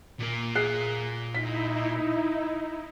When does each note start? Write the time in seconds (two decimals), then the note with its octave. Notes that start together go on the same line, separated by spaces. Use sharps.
0.20 A#2 A#3
0.55 G#4 F#6 C7
1.34 D#4 E4 B6